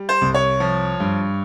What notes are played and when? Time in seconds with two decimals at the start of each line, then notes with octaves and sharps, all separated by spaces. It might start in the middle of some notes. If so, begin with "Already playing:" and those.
Already playing: G3
0.09 C5
0.22 C2
0.34 C#5
0.60 F3
1.00 G2